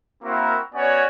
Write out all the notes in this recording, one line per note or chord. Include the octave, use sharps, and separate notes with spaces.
A#3 C4 E4 F#4 A#4
B3 C#4 F#4 C#5 D5 G#5